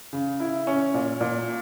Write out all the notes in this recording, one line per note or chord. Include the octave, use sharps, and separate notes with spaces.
C#3
E4
C#4
A#2
A#2